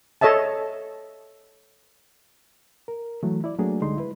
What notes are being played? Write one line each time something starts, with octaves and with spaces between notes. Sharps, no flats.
A4 C#5 D#5 E5 A5
A#4
E3 F#3 A3
E4 D5
F#3 A3 A#3 D4 F#4 G#4
C2 D3 G3 G#3 D#4 C6
E4 B4